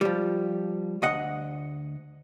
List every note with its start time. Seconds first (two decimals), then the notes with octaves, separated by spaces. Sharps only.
0.01 F3 G3
1.02 D2 D#5 F#5